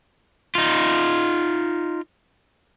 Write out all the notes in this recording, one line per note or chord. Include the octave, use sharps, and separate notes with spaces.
D#4 F4